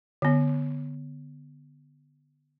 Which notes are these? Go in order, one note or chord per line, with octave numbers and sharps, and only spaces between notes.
D3 B3